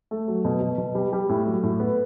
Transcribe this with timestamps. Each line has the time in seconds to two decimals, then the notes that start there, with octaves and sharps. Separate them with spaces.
0.11 A3
0.28 F#3
0.45 B2
0.62 B2
0.78 B2
0.95 G3
1.13 G3
1.29 A2
1.46 F#3
1.63 A2
1.80 B3